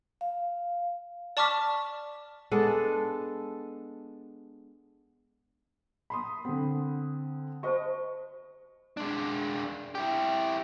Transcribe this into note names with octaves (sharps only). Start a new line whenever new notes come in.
F5
D5 A5 C#6 D6 F6 B6
G#3 B3 D4 A4
B5 C6 D#6
D3 C4 F#5
F#4 C5 D#5 A5 C#6
G#3 D4
E4 G4